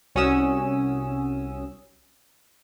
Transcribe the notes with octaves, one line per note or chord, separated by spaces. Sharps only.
C2 C#4 F#4 D#6 E6